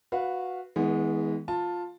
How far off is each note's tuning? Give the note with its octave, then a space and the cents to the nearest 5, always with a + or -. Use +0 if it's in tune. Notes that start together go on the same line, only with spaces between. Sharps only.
F#4 -15 B4 +0 F5 +0
E3 -40 G#3 +0 B3 +0
F4 +10 A5 +10